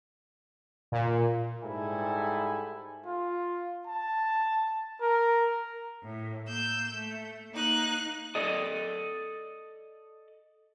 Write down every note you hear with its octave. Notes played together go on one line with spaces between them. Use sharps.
A#2
G#2 G3 E4 A4 G#5
F4
A5
A#4
A2
A#3 E6 G6
A3
A#3 D#4 F#6
A4 D5 D#5